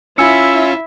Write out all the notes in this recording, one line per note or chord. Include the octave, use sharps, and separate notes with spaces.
C#4 E4 F4 E5 G#5 E6 C#7